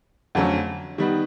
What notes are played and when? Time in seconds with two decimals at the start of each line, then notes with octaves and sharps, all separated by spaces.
0.35 F2 D3 F#3 A3 C#4
0.98 D#3 G3 B3